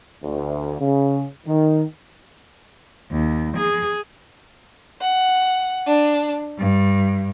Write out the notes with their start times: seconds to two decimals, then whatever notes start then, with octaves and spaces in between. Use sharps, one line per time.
0.24 D2
0.80 C#3
1.47 D#3
3.11 D#2
3.57 G#4
5.02 F#5
5.88 D4
6.59 G2